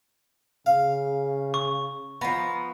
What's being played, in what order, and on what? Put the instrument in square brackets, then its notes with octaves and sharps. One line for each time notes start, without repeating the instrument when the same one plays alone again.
[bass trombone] C#3 [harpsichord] F5
[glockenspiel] C#6
[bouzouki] F3 B3 [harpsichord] A#5